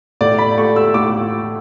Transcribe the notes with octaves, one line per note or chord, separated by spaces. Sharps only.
A2 D5
B5
A3 C#6
E6
A2 D6